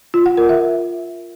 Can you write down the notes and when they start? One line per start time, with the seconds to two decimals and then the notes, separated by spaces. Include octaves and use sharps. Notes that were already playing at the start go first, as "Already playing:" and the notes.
0.14 F4
0.26 F#5
0.37 A#4
0.49 E5